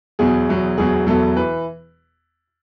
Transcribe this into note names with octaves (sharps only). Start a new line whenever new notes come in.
E2 B2 F#3 G#4
E2 B2 F#3
E1 E2 B2 F#3 G#4
E1 E2 B2 F#3 A4
E3 B4